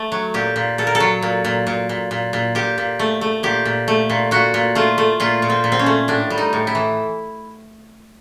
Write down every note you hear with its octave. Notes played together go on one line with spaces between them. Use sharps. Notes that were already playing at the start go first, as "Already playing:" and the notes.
Already playing: A3
F#3
A#2 G4
A#2
A#2 A4
A#4
A4
F#3
A#2
A#2
A#2
A#2
A#2
A#2
A#2 G4
A#2
A3
A3
A#2 G4
A#2
A3
A#2
A#2 F#4
A#2
A3 F4
A3
A#2 F4
A#2
C4
A#2
C4
C#4
A3
A2 D4
G3
D#4
A2
E4
E3